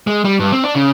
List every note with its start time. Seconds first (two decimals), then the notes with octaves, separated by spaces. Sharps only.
0.07 G#3
0.24 G3
0.39 G2
0.52 C4
0.64 D4
0.75 C#3